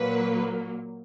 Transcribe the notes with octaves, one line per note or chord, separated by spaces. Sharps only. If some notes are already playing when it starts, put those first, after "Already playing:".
Already playing: A#2 F#3 A#3 B4